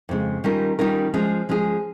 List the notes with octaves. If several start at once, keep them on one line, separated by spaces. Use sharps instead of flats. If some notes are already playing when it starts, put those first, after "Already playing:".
F2 C#3 G#3
D#3 G3 C#4 F4 A#4
D#3 G3 C#4 F4 A#4
F3 G#3 C#4 G#4
F3 G#3 C#4 G#4